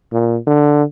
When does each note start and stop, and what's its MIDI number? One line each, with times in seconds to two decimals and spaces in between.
0.13 0.37 46
0.47 0.83 50